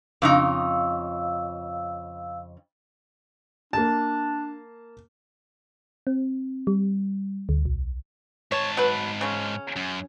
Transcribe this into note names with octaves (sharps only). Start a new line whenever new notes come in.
F2 C#3 D#4 F5 E6
A#3 D4 A5
C4
G3
D2
B1
G#2 C#5 A5
F#3 B4
C#3 C#4
F#2